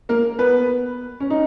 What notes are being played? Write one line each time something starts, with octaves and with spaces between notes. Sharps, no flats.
A#3 A#4
B3 B4
C#4
D#4